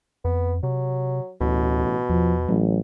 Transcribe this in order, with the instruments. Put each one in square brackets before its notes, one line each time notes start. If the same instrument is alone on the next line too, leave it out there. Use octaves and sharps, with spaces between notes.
[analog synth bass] F2 [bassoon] B3
[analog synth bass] C3 [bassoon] F#3
[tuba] A1 [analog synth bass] D2 [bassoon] B2
[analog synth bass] E2 [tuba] F3
[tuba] A1 [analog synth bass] F#3